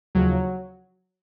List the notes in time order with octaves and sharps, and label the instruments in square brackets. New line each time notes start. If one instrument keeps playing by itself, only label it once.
[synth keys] D#2 C#3 F3 F#3